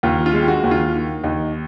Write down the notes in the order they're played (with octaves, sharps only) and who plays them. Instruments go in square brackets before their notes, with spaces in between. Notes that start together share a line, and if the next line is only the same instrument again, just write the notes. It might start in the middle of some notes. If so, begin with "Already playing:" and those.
[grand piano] D#2 F4
F4
G#3
G4
F#4
D#2
F4
D#3
D#2 D#4